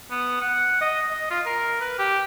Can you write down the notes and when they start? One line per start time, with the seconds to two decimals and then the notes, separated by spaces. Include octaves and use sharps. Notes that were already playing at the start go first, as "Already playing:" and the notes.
0.11 B3
0.41 F#5
0.81 D#5
1.10 D#5
1.30 F4
1.46 A#4
1.80 B4
1.99 G4